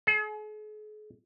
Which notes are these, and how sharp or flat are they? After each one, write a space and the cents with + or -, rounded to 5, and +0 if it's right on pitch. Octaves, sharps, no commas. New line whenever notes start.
G#4 +45